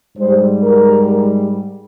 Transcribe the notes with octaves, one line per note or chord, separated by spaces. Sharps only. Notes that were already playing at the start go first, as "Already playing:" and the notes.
G#2 G3 C5
A#4